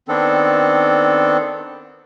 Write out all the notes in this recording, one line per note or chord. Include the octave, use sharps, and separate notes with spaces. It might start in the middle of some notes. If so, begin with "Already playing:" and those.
D#3 B3 C4 D4 A4